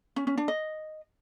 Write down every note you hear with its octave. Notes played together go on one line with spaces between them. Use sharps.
C#4
C#4
D4
D#5